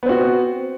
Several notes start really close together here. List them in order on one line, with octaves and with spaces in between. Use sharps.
B3 C4 F#4